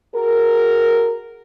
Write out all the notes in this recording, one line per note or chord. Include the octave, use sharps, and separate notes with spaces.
F#4 G#4 A#4